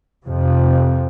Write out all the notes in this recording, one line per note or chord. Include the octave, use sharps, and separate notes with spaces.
F2 C3